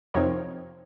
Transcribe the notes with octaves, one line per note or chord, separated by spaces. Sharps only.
F2 C3 F3 C4 D#4 A#4 C#5